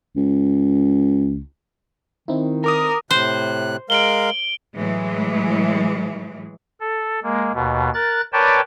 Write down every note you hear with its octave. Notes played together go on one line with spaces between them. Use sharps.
C#2
D#3 C4 D#4 E4
A#4 A#5 D6 D#6
A2 C3 C5 F#6
G#3 A#4 F5 D7 F#7 G7
A2 E3 F#3 G#3
A4
G#3 A#3
D#2 B2
A#4 F#6 A6
A#4 B4 C#5 D5 G5 A5